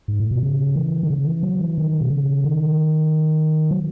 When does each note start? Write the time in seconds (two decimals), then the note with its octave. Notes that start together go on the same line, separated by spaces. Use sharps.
0.08 G#2
0.20 A2
0.31 B2
0.43 C#3
0.76 E3
1.03 D#3
1.10 C#3
1.26 E3
1.43 F#3
1.61 E3
1.78 D#3
2.01 B2
2.10 C#3
2.44 D#3
3.71 F#3